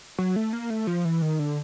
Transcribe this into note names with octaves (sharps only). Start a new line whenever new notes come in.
F#3
A3
A#3
A3
F3
E3
D#3
D3